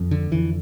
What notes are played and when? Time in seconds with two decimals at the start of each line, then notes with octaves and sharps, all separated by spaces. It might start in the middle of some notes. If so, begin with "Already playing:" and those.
Already playing: F2
0.11 D3
0.31 F2 D3 E3